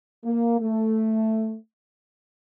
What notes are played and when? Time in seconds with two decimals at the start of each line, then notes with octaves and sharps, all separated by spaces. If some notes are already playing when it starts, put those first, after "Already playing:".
0.24 A#3
0.60 A3